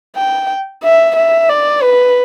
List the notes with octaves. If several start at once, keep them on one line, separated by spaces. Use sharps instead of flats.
G5
E5
E5
D5
B4